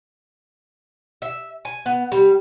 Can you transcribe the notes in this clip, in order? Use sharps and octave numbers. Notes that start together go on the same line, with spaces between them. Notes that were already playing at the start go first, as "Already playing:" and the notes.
E5
G#5
B3
G3